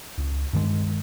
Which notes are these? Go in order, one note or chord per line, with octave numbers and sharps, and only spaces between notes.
C#2
G2 D#3 F3 G#3